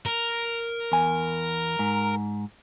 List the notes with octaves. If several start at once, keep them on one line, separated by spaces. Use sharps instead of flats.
A#4
E2 G#5
G#2